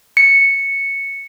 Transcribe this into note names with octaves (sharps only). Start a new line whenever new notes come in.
C#7